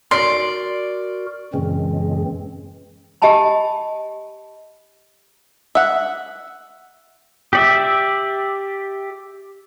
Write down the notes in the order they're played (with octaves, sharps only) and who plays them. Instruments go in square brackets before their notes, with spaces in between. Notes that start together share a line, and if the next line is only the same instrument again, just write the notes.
[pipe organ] F#4 A#4 [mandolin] D5 [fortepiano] C6
[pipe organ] F#2 E3 C4 [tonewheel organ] A#2 C#3 G#3
[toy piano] G4 D#5 G#5 A5 B5
[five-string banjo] E5 F#5
[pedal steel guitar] G4 D5 E5